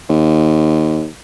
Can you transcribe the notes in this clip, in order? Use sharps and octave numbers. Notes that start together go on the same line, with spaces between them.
D#2